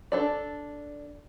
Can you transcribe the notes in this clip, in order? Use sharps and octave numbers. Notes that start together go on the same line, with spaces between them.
D4 A4 D5